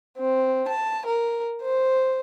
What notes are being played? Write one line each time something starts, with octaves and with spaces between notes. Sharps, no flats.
C4
A5
A#4
C5